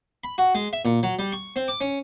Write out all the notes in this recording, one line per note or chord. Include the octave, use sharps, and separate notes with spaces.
B5
F#4
G#3
E5
A#2
F#3
G3
C#6
C4
D6
C#4